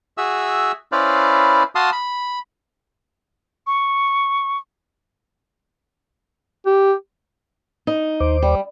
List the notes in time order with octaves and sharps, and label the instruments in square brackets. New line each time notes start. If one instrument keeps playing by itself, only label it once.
[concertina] F#4 G#4 E5 E6
C#4 E4 B4 C5 D5 F5
F#4 F5 A5 C6 D#6
B5
[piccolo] C#6
[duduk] G4
[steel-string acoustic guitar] D#4
[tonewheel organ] D#2 C5 D6
[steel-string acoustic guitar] G3